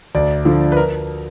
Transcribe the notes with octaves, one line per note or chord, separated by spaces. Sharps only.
D2 D5
D3 F3
B4
A#4